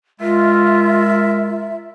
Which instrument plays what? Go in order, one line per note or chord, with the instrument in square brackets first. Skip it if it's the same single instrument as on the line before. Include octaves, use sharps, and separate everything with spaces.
[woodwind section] G#3 A#4 E5 [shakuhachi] F4